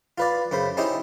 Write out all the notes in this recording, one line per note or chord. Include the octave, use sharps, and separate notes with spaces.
F4 B4 D5
F#2 C#3 C5 B5
C#4 D#4 E4 G4 C5 D#5